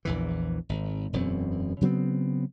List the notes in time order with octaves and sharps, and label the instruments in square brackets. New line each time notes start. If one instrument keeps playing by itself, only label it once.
[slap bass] A#1 E2 E3
G#1
E1 F#2 B2 C4
C#3 F#3 B3 C4